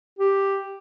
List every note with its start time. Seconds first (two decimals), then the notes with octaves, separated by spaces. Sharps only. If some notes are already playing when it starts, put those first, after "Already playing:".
0.19 G4